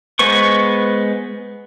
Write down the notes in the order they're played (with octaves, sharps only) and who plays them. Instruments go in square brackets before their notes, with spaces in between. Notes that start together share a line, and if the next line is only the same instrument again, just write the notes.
[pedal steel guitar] G#3 B3 B4 C5 C#6